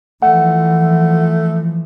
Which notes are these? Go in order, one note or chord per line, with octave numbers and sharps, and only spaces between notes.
E3 F3 A3 F#5